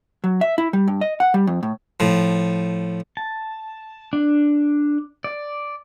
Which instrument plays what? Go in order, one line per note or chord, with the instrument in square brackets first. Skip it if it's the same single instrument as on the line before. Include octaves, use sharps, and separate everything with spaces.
[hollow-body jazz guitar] F#3
E5
E4
G3
G2
D#5
F#5
G3
F2
A2
[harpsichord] A2 F3
[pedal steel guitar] A5
D4
D5